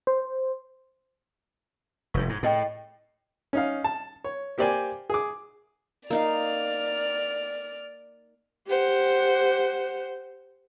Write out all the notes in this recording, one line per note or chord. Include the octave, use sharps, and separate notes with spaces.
C5
F1 G2 C#5 C#6
G#2
A2 G#4 D#5 G5
C#4 D#4 F5
A5
C#5
A#3 G4 C5 D5 G5 G#5
G#4 D6
A#3 D#4 D5 F5 F6
G4 C5 F#5